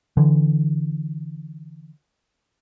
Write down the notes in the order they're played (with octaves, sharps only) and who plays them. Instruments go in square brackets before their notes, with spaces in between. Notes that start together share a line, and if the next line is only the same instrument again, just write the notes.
[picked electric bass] D3 E3